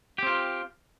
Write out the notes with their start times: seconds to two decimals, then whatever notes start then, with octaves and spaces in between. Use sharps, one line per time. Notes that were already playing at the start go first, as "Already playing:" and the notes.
0.18 G4
0.23 C4
0.27 F4